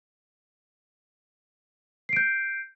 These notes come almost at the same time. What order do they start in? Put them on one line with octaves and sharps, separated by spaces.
C7 D7 G6